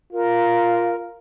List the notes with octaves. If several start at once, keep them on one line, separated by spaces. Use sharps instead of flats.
F4 A#4